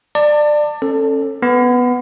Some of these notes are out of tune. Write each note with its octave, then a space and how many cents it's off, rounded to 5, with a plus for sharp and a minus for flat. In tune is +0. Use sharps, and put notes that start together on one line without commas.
D5 +20 A5 +35
C#4 -35 A4 +10
B3 +0 B5 +40